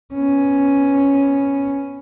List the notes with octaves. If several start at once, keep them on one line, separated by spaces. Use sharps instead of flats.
B3 C#4